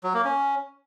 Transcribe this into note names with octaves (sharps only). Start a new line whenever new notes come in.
F#3
A#3
C#4